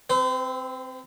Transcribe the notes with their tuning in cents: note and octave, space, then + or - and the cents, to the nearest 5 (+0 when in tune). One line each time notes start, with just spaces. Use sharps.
C4 +0 C5 -45